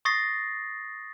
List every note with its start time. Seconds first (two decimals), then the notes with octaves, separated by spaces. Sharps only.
0.05 C#6 D#6 A6 A#6 C7